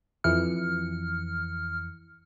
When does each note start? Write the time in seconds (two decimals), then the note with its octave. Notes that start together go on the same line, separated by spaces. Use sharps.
0.24 F2 E3 F6 C#7